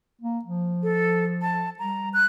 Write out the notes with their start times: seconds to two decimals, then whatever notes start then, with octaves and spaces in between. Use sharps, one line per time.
0.21 A#3
0.45 F3
0.83 A4
1.42 A5
1.79 G3 A#5
2.14 F#6